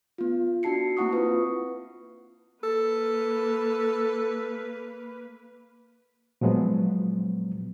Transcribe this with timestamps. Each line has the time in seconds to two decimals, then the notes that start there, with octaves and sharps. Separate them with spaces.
0.18 B3 F4
0.63 D4 F#4 A5 C7 C#7
0.97 A#3 C4 E4 F#5 C#6 D#6
1.13 F4 B4
2.63 A#3 A4 B4
6.41 A#2 F3 F#3 G#3 B3